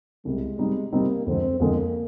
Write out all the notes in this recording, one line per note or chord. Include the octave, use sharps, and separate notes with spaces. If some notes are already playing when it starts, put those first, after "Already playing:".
C2 C3 G3 G#3
C3 G3 C4 D#4 G4
C3 G3 A#3 C4 D#4 G4
F2 D3 G#3 C4
F2 D3 G#3 A#3